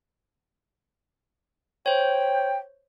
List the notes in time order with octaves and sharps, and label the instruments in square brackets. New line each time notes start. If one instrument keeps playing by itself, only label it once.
[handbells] C5 C#5 [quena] G5